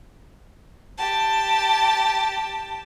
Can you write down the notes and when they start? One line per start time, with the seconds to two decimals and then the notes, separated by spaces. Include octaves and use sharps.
0.97 G4 A5